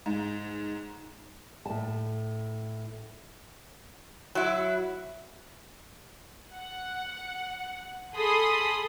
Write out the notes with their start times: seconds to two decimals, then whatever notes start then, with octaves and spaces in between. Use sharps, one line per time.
0.06 G#2
1.66 A2 A5
4.35 F#3 E4
6.52 F#5
8.15 G#4 A4 B5 C6 D#6